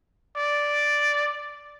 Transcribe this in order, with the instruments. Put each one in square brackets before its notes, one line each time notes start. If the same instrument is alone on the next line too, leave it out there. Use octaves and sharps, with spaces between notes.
[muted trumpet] D5